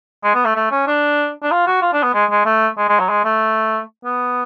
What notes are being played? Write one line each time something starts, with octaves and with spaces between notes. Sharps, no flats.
G#3
B3
A3
A3
C#4
D4
D4
F4
F#4
F4
D4
B3
G#3
G#3
A3
G#3
G#3
F#3
G#3
A3
B3